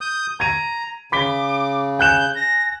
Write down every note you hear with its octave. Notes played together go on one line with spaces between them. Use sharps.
D#6 G6
A#5 G#6 D#7
C#3 B5 D6 B6 G7
G#5 F#6 G6 E7
A#6